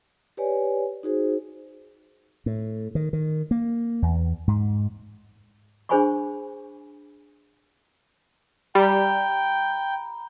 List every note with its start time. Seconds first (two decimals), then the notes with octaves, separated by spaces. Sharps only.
0.37 G4 B4 C#5 D5 G#5
1.03 D#4 F#4 G#4 C5
2.46 A2
2.95 D#3
3.13 D#3
3.51 A#3
4.02 E2
4.48 G#2
5.89 D4 G#4 C5 G#5 B5 C#6
8.75 G3 G5 A#5 B5